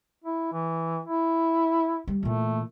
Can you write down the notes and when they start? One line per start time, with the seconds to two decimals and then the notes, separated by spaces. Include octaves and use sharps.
0.24 E4
0.53 E3
1.06 E4
2.07 G3
2.23 A#2 E3 A3